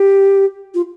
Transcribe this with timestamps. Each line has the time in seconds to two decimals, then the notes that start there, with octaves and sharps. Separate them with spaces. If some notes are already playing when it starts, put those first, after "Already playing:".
Already playing: G4
0.74 F4